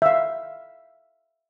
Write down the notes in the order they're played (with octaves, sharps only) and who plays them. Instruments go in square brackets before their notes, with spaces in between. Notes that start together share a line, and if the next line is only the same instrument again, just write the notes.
[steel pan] E5 F5